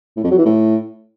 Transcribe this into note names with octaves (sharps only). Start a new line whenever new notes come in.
A2
F2
F#3
E3
A2